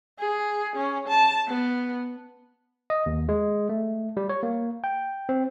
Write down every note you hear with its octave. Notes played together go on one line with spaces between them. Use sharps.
G#4
C#4
A5
B3
D#5
D#2
G#3
A3
G3
C#5
A#3
G5
C4